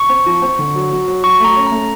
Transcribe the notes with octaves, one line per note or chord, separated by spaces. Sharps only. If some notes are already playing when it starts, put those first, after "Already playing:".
Already playing: C#6
C4
F3
C4
D3
F#3
F#3
F#3
F#3 C#6
A3 A#5
C#4
A3 A#5